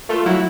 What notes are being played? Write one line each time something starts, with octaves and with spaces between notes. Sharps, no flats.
A3 F4 A4
F#3 E4 F#4